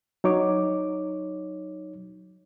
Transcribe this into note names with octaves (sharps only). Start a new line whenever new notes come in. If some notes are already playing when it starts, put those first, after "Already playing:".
F#3 D#4 C#5 D6